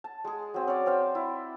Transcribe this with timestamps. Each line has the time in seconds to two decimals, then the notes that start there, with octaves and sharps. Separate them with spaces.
0.04 A5
0.24 G#3 G#4
0.54 F#3 C4
0.67 C#4 D5
0.86 C4 C5 F5 G5
1.15 E4